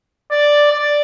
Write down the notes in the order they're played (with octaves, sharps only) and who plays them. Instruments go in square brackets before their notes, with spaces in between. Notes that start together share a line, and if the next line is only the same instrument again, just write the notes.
[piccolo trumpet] D5
D5